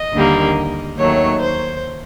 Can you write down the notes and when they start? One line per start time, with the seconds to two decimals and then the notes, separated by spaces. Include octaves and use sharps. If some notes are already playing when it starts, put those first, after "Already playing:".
Already playing: D#5
0.13 D#2 D3 G3 A#3
0.97 D#2 D#3 F#3 A3 C#5
1.41 C5